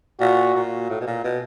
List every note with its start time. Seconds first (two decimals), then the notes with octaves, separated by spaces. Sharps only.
0.20 A#2 F#4
0.55 A#2
0.89 A2
1.01 B2
1.07 A#2
1.24 B2